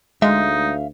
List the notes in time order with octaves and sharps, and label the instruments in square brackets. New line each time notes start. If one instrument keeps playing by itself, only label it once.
[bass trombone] D2 [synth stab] G#3 [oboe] D#4 [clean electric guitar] E5 F5